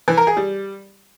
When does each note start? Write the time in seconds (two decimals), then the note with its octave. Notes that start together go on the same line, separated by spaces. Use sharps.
0.08 E3
0.17 A#4
0.27 G#4
0.37 G3